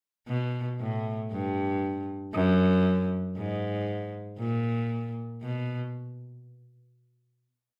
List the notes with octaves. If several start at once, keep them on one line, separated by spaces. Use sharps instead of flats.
B2
A2
G2
F#2
G#2
A#2
B2